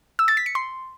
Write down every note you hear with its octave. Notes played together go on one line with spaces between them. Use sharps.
E6
A6
B6
C#7
C6